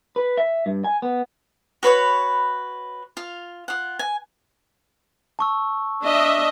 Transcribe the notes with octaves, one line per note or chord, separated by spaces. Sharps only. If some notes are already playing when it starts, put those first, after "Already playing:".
B4
E5
G2
G#5
B3
F#4 B4 C#5 B5
F4 F5
F4 F#5
G#5
A5 C#6 E6
D4 D#5 E5